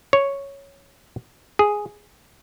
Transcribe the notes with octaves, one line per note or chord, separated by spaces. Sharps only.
C#5
G#4